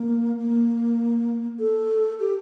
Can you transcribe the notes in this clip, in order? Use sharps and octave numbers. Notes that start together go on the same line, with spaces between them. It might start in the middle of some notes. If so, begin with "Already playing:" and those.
Already playing: A#3
A#3
A4
G4